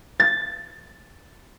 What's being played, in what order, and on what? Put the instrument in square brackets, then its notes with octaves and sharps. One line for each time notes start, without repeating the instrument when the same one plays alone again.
[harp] A6